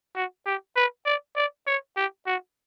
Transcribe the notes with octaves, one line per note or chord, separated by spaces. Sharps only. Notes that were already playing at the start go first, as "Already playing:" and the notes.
F#4
G4
B4
D5
D5
C#5
G4
F#4